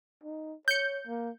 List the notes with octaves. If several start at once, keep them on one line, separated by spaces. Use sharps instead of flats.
D#4
C#5 G6 C#7
A#3